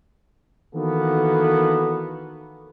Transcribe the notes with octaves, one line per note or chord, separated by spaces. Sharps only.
D#3 E3 A#3 B3 F#4 A4